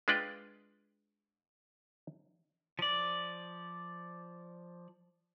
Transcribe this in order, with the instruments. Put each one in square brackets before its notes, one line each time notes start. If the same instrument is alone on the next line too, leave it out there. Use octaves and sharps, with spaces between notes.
[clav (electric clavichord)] G#3 D4 F4 B4 D5 G5
[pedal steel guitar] F3 D5